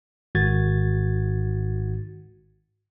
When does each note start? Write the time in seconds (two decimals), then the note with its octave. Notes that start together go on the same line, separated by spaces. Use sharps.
0.35 G#1 G#2 D#3 F#4 G#6 A6